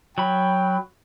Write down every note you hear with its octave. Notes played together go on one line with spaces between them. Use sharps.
F#3 G5 B5